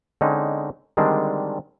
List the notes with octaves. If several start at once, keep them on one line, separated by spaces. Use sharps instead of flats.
D3 G#3 C4 C#4 D#4
D3 D#3 G3 G#3 C4 D4